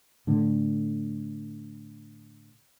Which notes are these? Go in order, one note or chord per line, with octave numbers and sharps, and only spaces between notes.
A2 D3